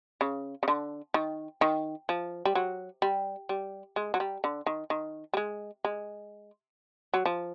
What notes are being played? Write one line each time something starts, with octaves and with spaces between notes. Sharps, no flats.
C#3
C#3
D3
D#3
D#3
F3
G3
F#3
G3
G3
G#3
F#3
G3
D3
D#3
D#3
G3
G#3
G#3
F#3
F3